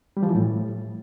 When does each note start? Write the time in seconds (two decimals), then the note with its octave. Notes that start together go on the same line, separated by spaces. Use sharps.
0.17 G3
0.23 F3
0.29 E3
0.35 A2